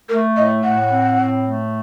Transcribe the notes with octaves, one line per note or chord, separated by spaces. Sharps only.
A3 A#4
A2 D#5
A2 F#5
C4
A2
A3